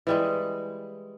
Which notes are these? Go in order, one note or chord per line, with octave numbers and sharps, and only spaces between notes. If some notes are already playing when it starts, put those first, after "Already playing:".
E3 G3 G#3